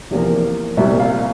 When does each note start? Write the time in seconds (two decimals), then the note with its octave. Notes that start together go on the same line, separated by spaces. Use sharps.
0.10 E2 C3 F3 A#3
0.77 C2 A#2 G3 E5
1.00 F5